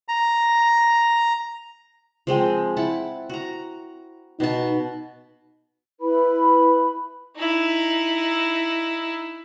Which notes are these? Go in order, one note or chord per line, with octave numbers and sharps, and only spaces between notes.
A#5
F3 G#3 C4
E4 F#5 A5
F#4 A#5
B2 D#4 A5
E4 B4 B5
D#4 E4